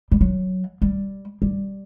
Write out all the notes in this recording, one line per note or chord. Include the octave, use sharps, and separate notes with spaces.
G3
F#3
G3
G3